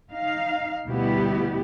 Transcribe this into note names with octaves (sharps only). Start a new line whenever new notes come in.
D#4 F5
D2 B2 G3 B3 E4 G4